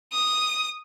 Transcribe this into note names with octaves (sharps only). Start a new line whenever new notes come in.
D#6